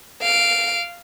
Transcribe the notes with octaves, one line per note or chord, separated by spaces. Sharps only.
F5 D7